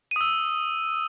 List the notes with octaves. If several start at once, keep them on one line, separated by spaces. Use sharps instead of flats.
D#6 E6 D#7